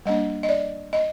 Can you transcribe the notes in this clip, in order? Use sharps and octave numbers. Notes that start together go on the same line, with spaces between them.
G3 A#3 D4 D#5
D#5
D5
D#5